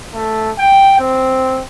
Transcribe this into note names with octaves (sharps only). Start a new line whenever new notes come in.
A3
G5
C4